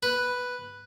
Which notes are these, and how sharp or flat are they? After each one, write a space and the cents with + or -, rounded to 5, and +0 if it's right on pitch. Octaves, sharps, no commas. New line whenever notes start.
B4 +0